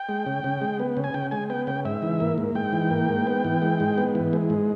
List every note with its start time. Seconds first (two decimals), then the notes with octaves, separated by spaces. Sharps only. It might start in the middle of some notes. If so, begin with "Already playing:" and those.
Already playing: G5
0.09 G#3
0.26 C#3
0.44 C#3
0.61 G#3
0.79 B3
0.97 C#3
1.04 G#5
1.14 C#3 G5
1.31 G#3 G#5
1.50 B3 G5
1.67 C#3 G5
1.85 G#2 E5
2.02 E3
2.20 A#3
2.38 G#2
2.55 G#2 G5
2.73 E3
2.91 A#3
3.09 G#2
3.27 B3
3.44 E3
3.62 G#3
3.80 G#2
3.98 B3
4.15 E3
4.33 G#3
4.50 G#2